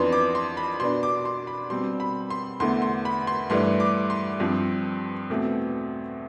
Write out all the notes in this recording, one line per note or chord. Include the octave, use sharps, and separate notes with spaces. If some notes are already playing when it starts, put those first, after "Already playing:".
Already playing: F2 E3 B3 D4 C6
D6
C6
B5
B2 B3 D4 C6
D6
C6
B5
B2 G3 C4 C6
B5
C6
E2 D3 A3 C6
C6
B5
C6
G2 E3 A3 D4 C6
D6
C6
G2 F3 C4
E2 B2 A3 C4